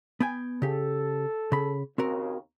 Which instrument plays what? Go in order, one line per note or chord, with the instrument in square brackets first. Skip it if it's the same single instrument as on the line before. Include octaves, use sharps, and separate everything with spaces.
[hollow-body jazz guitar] B3 G5 G#5
[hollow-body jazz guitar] C#3 G4 [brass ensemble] A4
[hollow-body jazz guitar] C#3 B5
[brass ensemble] D#2 C#3 [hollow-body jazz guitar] C4 F#4 A#4